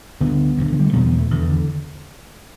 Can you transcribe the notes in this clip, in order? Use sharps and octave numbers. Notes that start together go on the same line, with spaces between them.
D2 D3 G3 B3
D2 D3
E3
G3
A3
E2 B2 G3 B3
G3 B3
E3 A3
E2 D3 E3
D3